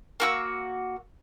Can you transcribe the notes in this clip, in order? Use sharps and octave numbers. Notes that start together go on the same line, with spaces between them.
A#3 F#4 E6